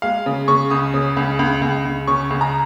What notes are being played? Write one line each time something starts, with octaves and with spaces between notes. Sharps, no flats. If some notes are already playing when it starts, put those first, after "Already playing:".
G#3 F5
C#3
C#3 C#6
C#2 D#6
C#3
C#2
C#2
C#2
C#2
C#3 C#6
C#2
A#5